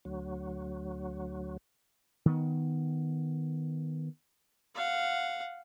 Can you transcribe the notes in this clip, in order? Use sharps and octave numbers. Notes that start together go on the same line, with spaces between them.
D2 F#3
D#3 B3
F5 F#5